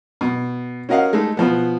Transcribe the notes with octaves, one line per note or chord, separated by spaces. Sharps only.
B2
C#4 F#4 A#4 D#5 F5 F#5
G#3 A3 D#4 A4
B2 F3 B3